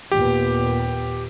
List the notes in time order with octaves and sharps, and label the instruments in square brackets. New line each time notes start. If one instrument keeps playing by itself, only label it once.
[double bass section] D#2 A#2 B3 [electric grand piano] G4